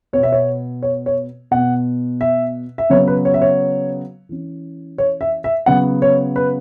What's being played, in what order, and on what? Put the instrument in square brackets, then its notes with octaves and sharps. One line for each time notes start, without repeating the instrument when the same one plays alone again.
[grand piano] B3 C#5
B2
E5
C#5
C#5
C#5
B2 B3 F#5
E5
E5
C#3 F#3 B3 C#5
B4
C#5
E5
C#5
E3 C#4
C#5
E5
E5
C#3 F#3 B3 F#5
C#5
B4